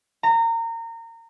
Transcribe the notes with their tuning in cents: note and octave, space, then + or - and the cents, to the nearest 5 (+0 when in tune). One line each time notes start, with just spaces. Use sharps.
A#5 -25